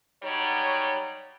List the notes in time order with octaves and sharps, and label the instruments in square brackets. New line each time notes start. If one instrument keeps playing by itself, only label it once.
[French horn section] F#3 G3 D#4 C#5